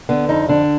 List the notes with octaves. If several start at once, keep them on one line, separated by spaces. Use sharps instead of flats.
D3 B3
F2 D#4
D3 D4